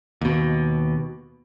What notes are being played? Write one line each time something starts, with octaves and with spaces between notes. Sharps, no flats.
D#2 B2